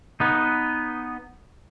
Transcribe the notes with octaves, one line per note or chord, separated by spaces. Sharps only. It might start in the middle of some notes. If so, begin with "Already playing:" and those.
B3 D#4